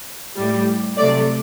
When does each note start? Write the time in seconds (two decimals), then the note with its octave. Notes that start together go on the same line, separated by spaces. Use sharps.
0.36 A2 G3
0.97 C3 F#3 A3 D5